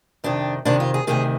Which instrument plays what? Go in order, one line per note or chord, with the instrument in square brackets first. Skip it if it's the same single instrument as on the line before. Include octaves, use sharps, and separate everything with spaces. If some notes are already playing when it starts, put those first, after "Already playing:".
[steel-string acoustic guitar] F2 C3 D#3 D4
F2 C3 D#3 D4
F4
G#4
D2 C3 D#3 G#4